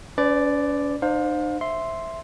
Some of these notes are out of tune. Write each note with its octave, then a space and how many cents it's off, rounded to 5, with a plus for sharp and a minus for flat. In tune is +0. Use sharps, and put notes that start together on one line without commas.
C#4 +45 B4 +35 D5 +0
D#4 -45 C5 +0 F5 +30
E5 +0 C6 +0